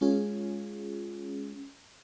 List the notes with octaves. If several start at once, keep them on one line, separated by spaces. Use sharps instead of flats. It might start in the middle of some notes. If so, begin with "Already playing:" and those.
G#3 C#4 F4 G#4